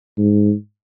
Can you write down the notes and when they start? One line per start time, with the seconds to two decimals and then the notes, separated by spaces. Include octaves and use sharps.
0.18 G#2